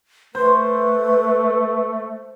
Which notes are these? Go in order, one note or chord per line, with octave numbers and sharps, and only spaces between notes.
A3 B4 C5